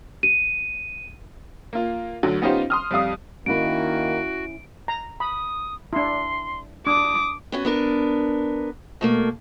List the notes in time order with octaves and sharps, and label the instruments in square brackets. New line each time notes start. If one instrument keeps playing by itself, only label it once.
[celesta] D#7
[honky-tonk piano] A#3 F4
D2 D3 F#3
B3 C#4 D#4 F4 G4 C5
C6 D#6 F6
F2 G3 F5 D#6
[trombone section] D#3 A#3 [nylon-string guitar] C#4 E4 [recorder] F#4 [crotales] D7
[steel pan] A#5
[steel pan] B5 [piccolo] D#6
[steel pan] D4 E4 [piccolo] C6
[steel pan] D4 [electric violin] D6 [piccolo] D#6
[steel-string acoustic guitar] B3 C#4 F#4
B3 D4 A#4
B2 A3 A#3